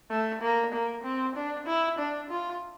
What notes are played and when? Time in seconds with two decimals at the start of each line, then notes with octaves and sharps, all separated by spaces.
0.10 A3
0.42 A#3
0.73 A#3
1.04 C4
1.36 D4
1.67 E4
1.99 D4
2.30 F4